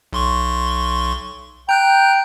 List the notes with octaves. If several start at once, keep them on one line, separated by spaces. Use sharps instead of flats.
B1 C6 C#6
G5 A#5 F#6 G6